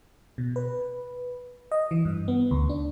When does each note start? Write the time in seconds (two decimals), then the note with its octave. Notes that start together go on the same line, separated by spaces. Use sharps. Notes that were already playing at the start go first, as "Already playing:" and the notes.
0.38 B2
0.56 B4
1.72 D#5
1.91 E3
2.05 G2
2.28 B3
2.51 D2
2.69 D4